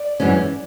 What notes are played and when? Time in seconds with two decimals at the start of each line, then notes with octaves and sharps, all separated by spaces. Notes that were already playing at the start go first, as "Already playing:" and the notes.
Already playing: D5
0.20 F#2 E3 G#3 C#4